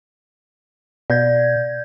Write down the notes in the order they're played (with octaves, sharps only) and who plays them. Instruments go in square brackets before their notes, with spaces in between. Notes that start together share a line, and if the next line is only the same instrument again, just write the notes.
[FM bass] B2 [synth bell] D5 G6 G#6